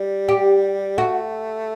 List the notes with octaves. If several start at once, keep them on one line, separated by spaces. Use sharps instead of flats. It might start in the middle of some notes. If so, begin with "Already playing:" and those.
Already playing: G3
G4
A3 F#4